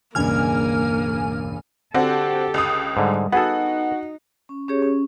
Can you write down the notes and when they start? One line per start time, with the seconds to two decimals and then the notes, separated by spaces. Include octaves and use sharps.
0.15 E1 C#2 G2 A#3 G#5 F6
1.94 D3 C4 F#4 G4 A4
2.54 C#2 D#6
2.97 G#2 D3 G3
3.32 B3 D#4 F#4 G#4 A4
4.49 C#4
4.68 C#4 G4 G#4 C#5
4.82 C#4